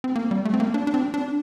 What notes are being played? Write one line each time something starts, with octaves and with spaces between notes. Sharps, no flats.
C4
A#3
G3
A3
C4
A#3
D4
D4
C4
D4